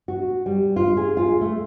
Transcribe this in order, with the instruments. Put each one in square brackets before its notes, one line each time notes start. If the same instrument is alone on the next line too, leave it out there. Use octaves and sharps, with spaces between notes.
[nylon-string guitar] F#4
G3
F4
G#4
F4
A3